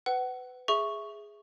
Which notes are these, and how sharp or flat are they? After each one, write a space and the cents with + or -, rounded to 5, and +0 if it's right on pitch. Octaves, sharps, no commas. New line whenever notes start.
B4 +30 F#5 +30
G#4 +0 E5 +0 C#6 +0